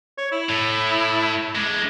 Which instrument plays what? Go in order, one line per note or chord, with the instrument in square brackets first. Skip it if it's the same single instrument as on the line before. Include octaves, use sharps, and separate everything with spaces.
[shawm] C#5
E4
[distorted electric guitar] A2
G#3 D4